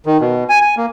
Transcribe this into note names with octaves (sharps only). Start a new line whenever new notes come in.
D#3
B2
G#5
G#5
A#3